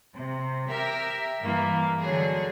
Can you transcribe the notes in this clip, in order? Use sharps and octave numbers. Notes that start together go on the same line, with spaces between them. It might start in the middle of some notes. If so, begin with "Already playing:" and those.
C3
G4 A#4 E5
G2 E3 A#3
D3 F#3 G#4